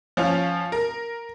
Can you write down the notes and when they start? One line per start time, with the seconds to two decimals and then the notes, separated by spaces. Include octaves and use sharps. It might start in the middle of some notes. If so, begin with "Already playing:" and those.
0.17 F3 C#4 F4
0.72 A#4